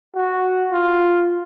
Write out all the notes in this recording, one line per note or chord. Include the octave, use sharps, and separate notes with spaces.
F#4
F4